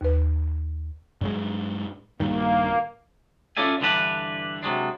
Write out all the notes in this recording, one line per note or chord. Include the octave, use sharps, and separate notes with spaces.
D#2 B4
G2 F#3 G#3
A#1 G2 D#3 A#3
C#4 F4 A4 D5 E5 G#5
G2 D3 E3 D4 B4 A5
C3 F#3 G#3 D4